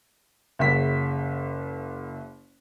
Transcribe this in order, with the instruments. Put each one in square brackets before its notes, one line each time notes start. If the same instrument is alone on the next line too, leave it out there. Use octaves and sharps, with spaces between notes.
[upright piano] F#1 C#3 E5 F#5 B6